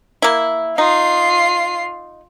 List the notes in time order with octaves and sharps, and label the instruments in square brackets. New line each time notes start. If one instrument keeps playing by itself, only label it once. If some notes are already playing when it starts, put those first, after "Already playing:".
[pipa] A#3 E4
[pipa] D#4 [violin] F4 C7